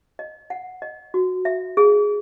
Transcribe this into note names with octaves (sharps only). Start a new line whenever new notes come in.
D#5
F#5
D#5
F#4
E5
G#4